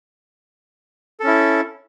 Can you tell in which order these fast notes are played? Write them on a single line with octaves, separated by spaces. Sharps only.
A4 C#4 E4